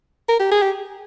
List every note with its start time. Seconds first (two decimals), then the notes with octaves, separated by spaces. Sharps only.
0.29 A#4
0.40 G4
0.51 G#4
0.62 G4